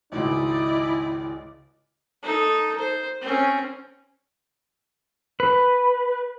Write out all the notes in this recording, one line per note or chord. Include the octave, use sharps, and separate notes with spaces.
G#1 C#2 D#4 E4 D5 D#5
D#4 A4
C5
C4 C#4
B4